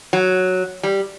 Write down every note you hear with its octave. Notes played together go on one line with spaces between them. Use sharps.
F#3
G3